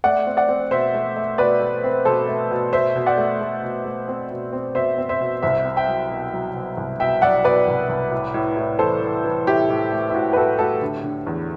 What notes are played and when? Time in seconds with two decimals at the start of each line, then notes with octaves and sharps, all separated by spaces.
0.04 A3 D5 F#5
0.27 C4
0.37 D5 F#5
0.48 C4
0.71 B2 C5 E5
0.94 A3
1.17 A3
1.38 B2 B4 D5
1.61 A3
1.84 C4
2.05 B2 A4 C5
2.28 A3
2.51 B2
2.73 B2 C5 E5
2.96 B2
3.06 D5 F#5
3.18 A3
3.41 A3
3.63 B2
3.85 A3
4.08 C4
4.31 B2
4.53 C4
4.75 B2 C5 E5
4.98 C4
5.09 C5 E5
5.21 B2
5.42 C2 C5 E5
5.65 C4
5.76 E5 G5
5.88 F#3
6.11 B2
6.33 F#3
6.55 B2
6.77 C2
7.00 B2 E5 G5
7.22 F#3 D5 F#5
7.44 B2 B4 D5
7.68 C2
7.89 C2
8.12 A2
8.34 A2
8.57 A2
8.79 E3 A4 C5
9.01 E3
9.24 E3
9.47 A2 E4 G4
9.69 A2
9.91 A3
10.09 E4
10.14 A2 F#4
10.33 B4
10.36 A2 F#4 A4
10.59 A3 F#4 A4
10.81 D3
11.04 D3
11.27 E2